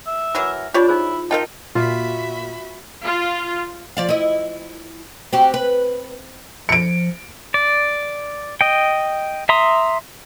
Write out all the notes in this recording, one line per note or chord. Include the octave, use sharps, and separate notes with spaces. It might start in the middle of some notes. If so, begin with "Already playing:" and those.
E5
E3 F#3 A#4
D4 F4 G4 C#5 D5 B5
D#4 E4 G#4 C5
D#4 F4 A#4 D#5 F5 G5 A5
A#2 F4 F#4 E5 B5
F4
F3 D5 F5
E4 D#5
C4 F#4 G4
B4
F3 C#7 D7
D5
D#5 G5
E5 A#5 C6 D#6